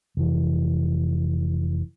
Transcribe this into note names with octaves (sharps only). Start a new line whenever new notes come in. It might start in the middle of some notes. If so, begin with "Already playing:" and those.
F1 E3